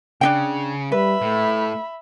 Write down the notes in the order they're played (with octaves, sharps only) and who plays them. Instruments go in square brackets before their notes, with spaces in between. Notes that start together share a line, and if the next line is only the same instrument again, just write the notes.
[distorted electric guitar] C#3 [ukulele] D4 D#4 G5
[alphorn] G3 [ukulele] B4 [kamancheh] E5 B5
[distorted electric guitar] A2 [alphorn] A3